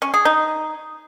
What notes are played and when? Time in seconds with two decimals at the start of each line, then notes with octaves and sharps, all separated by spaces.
0.02 C#4
0.14 G#4
0.25 D#4